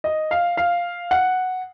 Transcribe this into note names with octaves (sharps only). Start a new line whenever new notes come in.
D#5
F5
F5
F#5